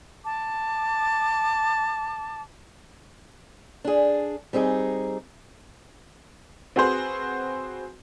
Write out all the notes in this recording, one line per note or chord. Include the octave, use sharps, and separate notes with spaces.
A5 D6
D4 G#4
G3 C4 D#4 G#4
C4 F#4 G#4 B4 C5